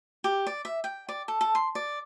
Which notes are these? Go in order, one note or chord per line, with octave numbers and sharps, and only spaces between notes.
G4
D5
E5
G5
D5
A4
A4
C6
D5